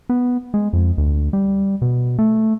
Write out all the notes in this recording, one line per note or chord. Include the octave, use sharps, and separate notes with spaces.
B3
G#3
F2
D2
G3
B2
A3